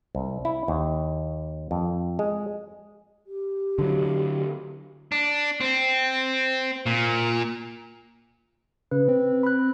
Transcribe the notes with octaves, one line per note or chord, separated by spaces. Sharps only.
C2
E4
D#2
F2
G#3
G4
D3 F#3
D4
C4
A#2
C#3 B4
C4
B5 F#6